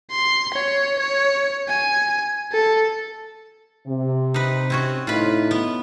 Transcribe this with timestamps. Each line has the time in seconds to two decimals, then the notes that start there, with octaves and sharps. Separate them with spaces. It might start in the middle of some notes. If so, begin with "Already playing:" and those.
0.11 C6
0.54 C#5
0.98 C#5
1.69 G#5
2.52 A4
3.88 C3
4.34 D#4 B4
4.70 C4 C#4 F#4
5.07 A2 D#4 F4 B4
5.51 B3